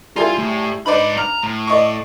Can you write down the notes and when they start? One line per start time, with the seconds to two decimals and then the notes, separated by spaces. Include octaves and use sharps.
0.16 G3 E4 F4 G#4
0.38 A2
0.86 G#2 D#4 B4 D5 B5
1.18 A#5 F6
1.43 A2
1.67 D5 D#5 C#6